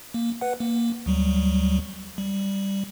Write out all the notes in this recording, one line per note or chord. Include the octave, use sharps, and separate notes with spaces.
A#3
B4 F#5
A#3
D2 F#3 G3
G3